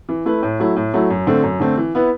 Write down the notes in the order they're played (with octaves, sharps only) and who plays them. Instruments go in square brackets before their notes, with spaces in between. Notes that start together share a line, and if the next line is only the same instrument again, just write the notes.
[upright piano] E3
A3 E4 B4
A2
F#3 A3 E4
A2
F#3 A3 E4
F#2
D3 A3 C4
F#2
D3 A3 C4
E3
B3 E4 B4